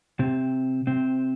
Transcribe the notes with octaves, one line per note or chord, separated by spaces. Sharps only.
C3 C4
C3 C4